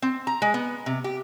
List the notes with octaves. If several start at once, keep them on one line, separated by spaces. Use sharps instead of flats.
C4
A#5
G#3
B3
C3
G4